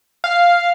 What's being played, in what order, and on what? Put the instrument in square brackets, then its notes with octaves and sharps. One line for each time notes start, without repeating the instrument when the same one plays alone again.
[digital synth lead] F5